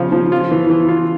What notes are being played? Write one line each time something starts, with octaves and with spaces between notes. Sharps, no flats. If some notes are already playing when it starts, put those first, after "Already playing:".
Already playing: C#3 F3
F3
F4
E3
E3
F4